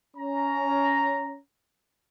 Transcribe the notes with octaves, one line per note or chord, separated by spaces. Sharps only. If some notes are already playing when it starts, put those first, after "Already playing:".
C#4 A#5